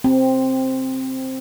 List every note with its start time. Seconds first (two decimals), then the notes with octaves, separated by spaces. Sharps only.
0.04 C4